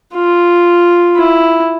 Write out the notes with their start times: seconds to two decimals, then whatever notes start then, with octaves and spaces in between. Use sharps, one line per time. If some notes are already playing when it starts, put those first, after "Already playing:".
0.15 F4
1.16 E4